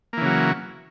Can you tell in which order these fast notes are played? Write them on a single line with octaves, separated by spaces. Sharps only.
A#3 E3 C#3 F#3